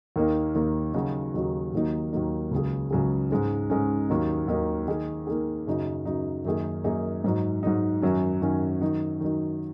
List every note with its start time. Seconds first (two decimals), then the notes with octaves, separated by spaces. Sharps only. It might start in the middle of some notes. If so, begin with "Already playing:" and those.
0.16 D#2 D#3 A#3 D#4
0.55 D#2 D#3 A#3 D#4
0.94 D#2 C#3 F#3 D#4 F#4
1.34 D#2 C#3 F#3 D#4 F#4
1.73 D#2 D#3 F#3 A#3 D#4
2.13 D#2 D#3 F#3 A#3 D#4
2.51 C#2 C#3 F#3 C#4 G#4
2.91 C#2 C#3 F#3 C#4 G#4
3.30 G#2 G#3 C#4
3.70 G#2 G#3 C#4
4.09 D#2 D#3 F#3 A#3 D#4
4.48 D#2 D#3 F#3 A#3 D#4
4.88 D#3 A#3 D#4 G#4
5.27 D#3 A#3 D#4 G#4
5.67 F#2 C#3 F#3 D#4
6.05 F#2 C#3 F#3 D#4
6.45 F#2 D#3 A#3 D#4 G#4
6.84 F#2 D#3 A#3 D#4 G#4
7.24 G#2 F#3 D#4
7.63 G#2 F#3 D#4
8.02 F#2 D#3 F#3 C#4
8.42 F#2 D#3 F#3 C#4
8.81 D#3 F#3 D#4
9.20 D#3 F#3 D#4